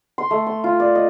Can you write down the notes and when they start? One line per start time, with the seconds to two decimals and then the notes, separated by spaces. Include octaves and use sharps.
0.18 C6
0.31 A3
0.47 C6
0.64 F4
0.80 D5
0.95 D#5